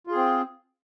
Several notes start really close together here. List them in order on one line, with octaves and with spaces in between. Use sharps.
F4 G#4 C4